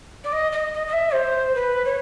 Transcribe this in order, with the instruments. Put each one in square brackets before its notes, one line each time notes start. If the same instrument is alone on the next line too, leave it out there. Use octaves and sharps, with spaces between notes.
[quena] D5
D#5
D#5
D#5
D#5
E5
C5
B4
C#5